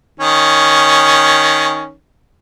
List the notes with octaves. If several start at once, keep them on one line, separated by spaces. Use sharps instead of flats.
D#3 C#4